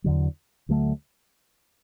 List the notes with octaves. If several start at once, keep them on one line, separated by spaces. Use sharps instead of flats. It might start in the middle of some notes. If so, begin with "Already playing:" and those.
E2 D3 F#3
D2 D3 F#3 A3